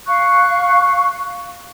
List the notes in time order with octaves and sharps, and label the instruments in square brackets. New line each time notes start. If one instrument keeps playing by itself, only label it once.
[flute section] F5 C#6 F#6